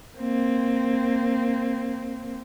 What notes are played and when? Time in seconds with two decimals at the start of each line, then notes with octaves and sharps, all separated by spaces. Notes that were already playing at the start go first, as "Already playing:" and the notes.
0.17 A#3 C4